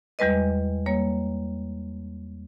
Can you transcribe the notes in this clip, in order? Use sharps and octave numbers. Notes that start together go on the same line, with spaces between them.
E2 G3 G#3 B4 D#5
G3 A#3 C#5